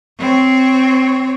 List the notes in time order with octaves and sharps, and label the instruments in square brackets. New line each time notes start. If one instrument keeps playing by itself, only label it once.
[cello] C4 C#5